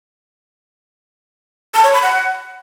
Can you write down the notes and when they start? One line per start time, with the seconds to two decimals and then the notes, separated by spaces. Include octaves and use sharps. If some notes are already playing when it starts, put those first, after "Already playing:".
1.74 A5
1.84 C#5
1.93 B5
2.03 F#5